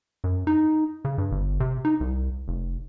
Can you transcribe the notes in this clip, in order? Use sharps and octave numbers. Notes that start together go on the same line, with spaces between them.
F#2
D#4
C#3
G2
G1
C3
D#4
C2
F1